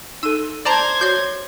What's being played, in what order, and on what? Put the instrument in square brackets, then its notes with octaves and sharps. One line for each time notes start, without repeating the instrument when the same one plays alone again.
[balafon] D#4 A4 [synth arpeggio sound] E6 D#7
[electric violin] C5 G#6 [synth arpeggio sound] D5 A5 A#5
[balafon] F#4 C#5 [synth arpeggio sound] G6 C7